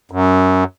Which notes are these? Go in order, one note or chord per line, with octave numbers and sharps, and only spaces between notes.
F#2